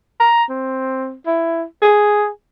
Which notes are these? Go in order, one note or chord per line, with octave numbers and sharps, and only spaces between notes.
A#5
C4
E4
G#4